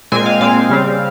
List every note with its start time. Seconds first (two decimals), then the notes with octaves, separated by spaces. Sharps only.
0.12 A#2 G#3 C4 G#5
0.26 F5
0.41 A#2 G#3 C4 F5
0.70 C#3 G3 C4